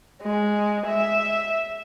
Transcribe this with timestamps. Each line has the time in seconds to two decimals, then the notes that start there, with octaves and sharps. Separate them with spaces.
0.22 G#3
0.87 E5